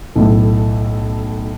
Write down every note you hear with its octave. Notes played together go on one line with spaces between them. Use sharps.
B1 A2 A3